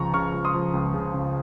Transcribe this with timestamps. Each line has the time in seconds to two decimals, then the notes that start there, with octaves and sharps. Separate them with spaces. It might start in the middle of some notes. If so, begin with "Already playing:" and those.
Already playing: C#2 C#3 F3 A#5 C#6
0.14 C#3 C#6 F6
0.34 C#2
0.45 C6 D#6
0.54 F3
0.74 C#2
0.94 C#3
1.14 C#3